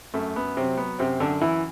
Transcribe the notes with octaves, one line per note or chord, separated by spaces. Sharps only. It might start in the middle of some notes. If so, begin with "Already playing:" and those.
F#2 A3
F#2 B3
C3 F#3 C4
F#3 B3
F#2 C3 C4
F#2 D3 D4
F#2 E3 E4